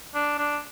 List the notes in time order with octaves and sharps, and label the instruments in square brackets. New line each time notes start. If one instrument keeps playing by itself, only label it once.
[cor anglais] D4
D4